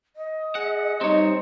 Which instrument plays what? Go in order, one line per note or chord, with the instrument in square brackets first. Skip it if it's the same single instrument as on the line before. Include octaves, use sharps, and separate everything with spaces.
[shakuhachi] D#5
[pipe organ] G#4 [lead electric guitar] F#5
[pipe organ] G3 C5 [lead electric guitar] C4 C#5 [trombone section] D#4